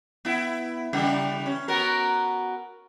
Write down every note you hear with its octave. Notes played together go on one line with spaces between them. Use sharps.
B3 E4
C#3 E3 G3
C#4
B3 F#4 A#4